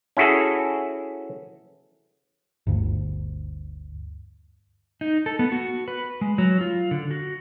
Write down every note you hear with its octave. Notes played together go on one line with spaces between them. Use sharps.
C#4 E4 F#4 G#4 A4
G1 D2
D#4
A4
B3
F#4
B4
G#3
F#3
F4
D3
F#4